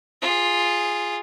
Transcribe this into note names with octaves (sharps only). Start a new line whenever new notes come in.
F4 G#4